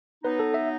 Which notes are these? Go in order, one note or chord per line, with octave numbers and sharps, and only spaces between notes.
F#3 B3 D#4 B4
A4
E5